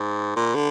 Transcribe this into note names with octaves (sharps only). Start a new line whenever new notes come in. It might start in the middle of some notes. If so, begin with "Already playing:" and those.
Already playing: G#2
A#2
D3